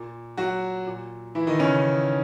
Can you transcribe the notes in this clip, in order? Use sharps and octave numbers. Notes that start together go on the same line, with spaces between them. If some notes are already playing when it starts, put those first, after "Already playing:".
Already playing: A#2
F#3 F#4
A#2
E3 E4
D#3 D#4
C#3 C#4